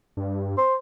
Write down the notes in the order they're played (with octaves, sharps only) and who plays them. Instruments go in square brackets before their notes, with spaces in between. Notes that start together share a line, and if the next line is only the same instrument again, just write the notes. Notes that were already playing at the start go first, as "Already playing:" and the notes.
[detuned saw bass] G2
[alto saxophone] C5